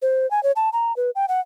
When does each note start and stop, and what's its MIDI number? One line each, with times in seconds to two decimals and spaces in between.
0.02 0.29 72
0.31 0.42 80
0.43 0.52 73
0.56 0.70 81
0.73 0.95 82
0.97 1.10 71
1.15 1.26 79
1.28 1.40 78